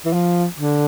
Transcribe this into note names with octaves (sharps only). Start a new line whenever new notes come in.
E3
F3
D3